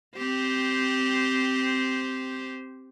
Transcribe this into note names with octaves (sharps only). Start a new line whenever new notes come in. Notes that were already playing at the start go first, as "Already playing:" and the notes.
C4 G4 C5